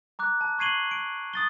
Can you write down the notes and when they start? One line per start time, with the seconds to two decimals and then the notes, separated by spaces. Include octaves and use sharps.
0.19 A#5 D6 F#6
0.41 A5
0.59 C#6 G#6 C7 D#7 F#7 G7
0.91 D7
1.34 D#6 A6 G7